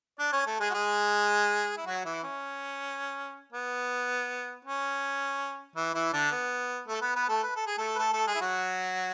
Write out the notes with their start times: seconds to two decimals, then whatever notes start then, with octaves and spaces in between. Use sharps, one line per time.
0.19 D4 D5
0.33 C#4 C#5
0.46 A3 A4
0.60 G#3 G#4
0.70 F#4
0.74 G#3 G#4
1.77 E4
1.86 F#3 F#4
2.05 E3 E4
2.23 C#4
3.53 B3
4.65 C#4
5.76 E3 E4
5.94 E3 E4
6.13 D3 D4
6.32 B3
6.88 A3 A4
7.02 B3 B4
7.16 B3 B4
7.29 A3 A4
7.43 B4
7.56 A4
7.67 G#4
7.78 A3 A4
7.95 B4
7.99 A3 A4
8.13 A3 A4
8.27 G#3 G#4
8.35 E4
8.41 F#3 F#4